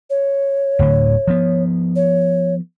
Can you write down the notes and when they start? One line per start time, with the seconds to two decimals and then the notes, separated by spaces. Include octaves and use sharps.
0.10 C#5
0.79 D1 A2 D3
1.28 F3 B3
1.96 C#5